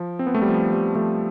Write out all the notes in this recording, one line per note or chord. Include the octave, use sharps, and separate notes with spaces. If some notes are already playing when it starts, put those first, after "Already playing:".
Already playing: F3
C4
B3
A3
G3
F3
G3
F3 A3